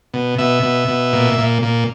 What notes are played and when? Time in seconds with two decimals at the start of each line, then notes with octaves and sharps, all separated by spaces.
0.14 B2
0.38 B2 E5
0.63 B2
0.88 B2
1.13 A#2
1.38 A#2
1.62 A#2